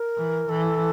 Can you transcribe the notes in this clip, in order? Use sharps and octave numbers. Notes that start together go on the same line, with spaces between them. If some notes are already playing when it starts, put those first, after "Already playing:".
Already playing: A#4
E3
E3 A4